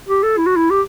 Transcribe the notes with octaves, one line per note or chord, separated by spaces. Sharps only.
G4
A4
E4
F#4
E4
G4